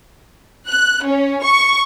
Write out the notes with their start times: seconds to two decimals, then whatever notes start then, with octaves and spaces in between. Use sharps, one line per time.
0.67 F#6
1.06 C#4
1.44 C#6